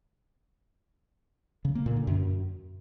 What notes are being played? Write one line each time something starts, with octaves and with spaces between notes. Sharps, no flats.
C#3
A#3
A#2
D3
F#2